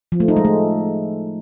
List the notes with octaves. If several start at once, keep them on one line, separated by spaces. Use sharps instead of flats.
F3
A3
D#4
G#3
A3